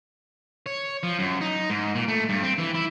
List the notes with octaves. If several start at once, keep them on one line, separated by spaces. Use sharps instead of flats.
C#5
F3
F#2
D#4
G#2
A#2
A3
G2
C4
E3
E4